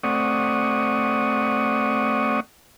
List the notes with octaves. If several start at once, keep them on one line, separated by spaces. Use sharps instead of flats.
A3 C4 D5 F#5 C#6 D#6